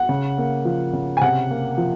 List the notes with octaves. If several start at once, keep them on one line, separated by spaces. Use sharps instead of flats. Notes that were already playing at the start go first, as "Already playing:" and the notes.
Already playing: F#5
C#3
A#3
F3
C#3
G#5
C3 F#5
A#3
F3